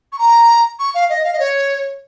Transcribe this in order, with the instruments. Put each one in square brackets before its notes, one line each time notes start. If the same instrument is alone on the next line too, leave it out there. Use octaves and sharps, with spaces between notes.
[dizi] C#6
A#5
C#6
F5
D#5
F5
D#5
C#5